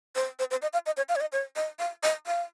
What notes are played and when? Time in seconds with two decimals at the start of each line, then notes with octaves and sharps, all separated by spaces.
0.15 C5
0.39 C5
0.51 C5
0.62 D#5
0.73 F5
0.86 D#5
0.97 C#5
1.09 F5
1.16 C#5
1.21 D#5
1.32 C#5
1.56 D#5
1.79 F5
2.03 D#5
2.27 F5